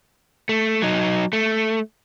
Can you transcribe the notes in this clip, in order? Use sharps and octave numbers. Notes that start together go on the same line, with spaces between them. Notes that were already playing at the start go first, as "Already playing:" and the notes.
A3
F#3 D#4
A3